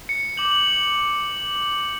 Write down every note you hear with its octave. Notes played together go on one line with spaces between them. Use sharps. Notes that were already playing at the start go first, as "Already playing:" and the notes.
C#7
D6 G6 F#7
F#7